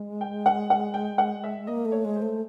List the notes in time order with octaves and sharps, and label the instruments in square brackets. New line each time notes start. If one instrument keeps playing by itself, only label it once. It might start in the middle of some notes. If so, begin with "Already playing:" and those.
Already playing: [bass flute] G#3
[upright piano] G5
F#5
F#5
G5
F#5
E5
[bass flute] A#3 [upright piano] D#5
[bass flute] A3
[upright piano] C#5
[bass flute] G#3
[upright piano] C5
[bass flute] A3